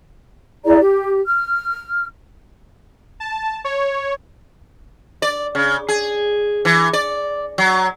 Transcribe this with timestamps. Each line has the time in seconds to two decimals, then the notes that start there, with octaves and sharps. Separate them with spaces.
0.65 E4 G#4 D5 A#5
0.79 G4
1.26 F6
3.20 A5
3.64 C#5
5.22 D5
5.55 C#3
5.88 G#4
6.65 E3
6.93 D5
7.58 F#3